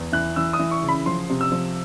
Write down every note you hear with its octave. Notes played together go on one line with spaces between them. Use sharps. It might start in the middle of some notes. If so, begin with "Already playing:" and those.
Already playing: E2
E3 F#6
E3 E6
D#6
E3
C#6
C#3
B5
F3 C6
C3
E6
F3